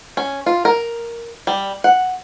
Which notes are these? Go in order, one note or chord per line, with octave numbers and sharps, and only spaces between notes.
C#4
F4
A#4
G3
F#5